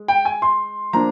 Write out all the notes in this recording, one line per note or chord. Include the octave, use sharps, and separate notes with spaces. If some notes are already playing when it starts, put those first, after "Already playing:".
Already playing: G#3
G5
G#5
C6
F3 A#3 D4 A#5